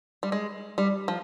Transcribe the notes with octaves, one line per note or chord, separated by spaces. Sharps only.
G3
G#3
G3
F3